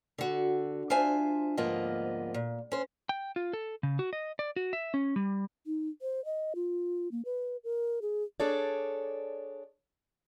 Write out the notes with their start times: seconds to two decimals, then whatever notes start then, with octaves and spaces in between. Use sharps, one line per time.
0.18 D3 F#4
0.90 D4 F4 C5 E5 G#5
1.57 D2 G#2 F3 A#3 B3 D#5
2.34 A#2
2.72 C#4 C5
3.09 G5
3.36 F4
3.53 A4
3.83 C#3
3.99 F#4
4.13 D#5
4.39 D5
4.56 F#4
4.73 E5
4.94 C#4
5.16 G3
5.66 D#4
6.02 C5
6.25 D#5
6.55 F4
7.12 A#3
7.25 B4
7.64 A#4
8.02 G#4
8.40 D4 G#4 A4 C#5 D5